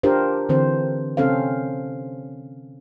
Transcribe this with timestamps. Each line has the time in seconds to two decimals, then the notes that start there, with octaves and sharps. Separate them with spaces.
0.03 D4 F4 G4 A#4 C5
0.49 D3 E3 C4 C5
1.17 C3 C4 C#4 A4 C5 F5